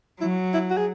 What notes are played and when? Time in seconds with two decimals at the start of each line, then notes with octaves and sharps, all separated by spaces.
0.21 F#3 E4
0.54 E4
0.70 F#4
0.78 G#4